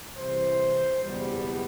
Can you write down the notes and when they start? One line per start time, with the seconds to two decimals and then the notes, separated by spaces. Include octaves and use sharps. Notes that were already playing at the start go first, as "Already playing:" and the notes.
0.17 C2 C3 E3 C5
1.02 F#1 E2 B2 G3 B3